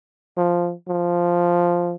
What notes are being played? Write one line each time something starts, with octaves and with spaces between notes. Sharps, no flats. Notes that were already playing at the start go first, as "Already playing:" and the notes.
F3
F3